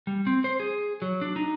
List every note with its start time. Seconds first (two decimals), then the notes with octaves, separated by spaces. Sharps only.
0.07 G3
0.27 C4
0.44 C5
0.60 G#4
1.02 F#3
1.21 D4
1.36 D#4